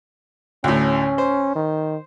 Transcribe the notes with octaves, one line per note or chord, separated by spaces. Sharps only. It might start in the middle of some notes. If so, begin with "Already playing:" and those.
D2 A2 C#4
C5
D#3